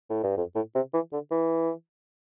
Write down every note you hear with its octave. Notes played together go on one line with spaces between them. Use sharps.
A2
G2
F2
A2
C3
E3
D3
E3